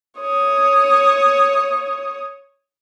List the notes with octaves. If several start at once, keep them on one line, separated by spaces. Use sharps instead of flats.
C#5 D#6